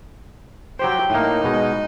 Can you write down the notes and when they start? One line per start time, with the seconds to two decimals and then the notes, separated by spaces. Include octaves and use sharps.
0.79 F#3 G4 C5 G5
1.10 A2 A#3 D#4
1.44 B2 G#3